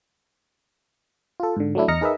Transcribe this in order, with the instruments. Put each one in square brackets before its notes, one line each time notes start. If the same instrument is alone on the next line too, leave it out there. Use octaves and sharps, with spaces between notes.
[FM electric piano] F4 A4
G#2 D3
F#3 A3 D4 E4
E2 D#5 A#5 F6 A#6 C#7
D#4 G#4 A#4 B4 D#5 E5